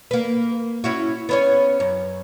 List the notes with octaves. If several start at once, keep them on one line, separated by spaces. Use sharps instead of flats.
A#3 B4
C#4 E4 F#4
B3 C#4 C#5
F#2